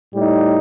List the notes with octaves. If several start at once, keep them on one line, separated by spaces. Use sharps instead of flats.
A2 G3 D#4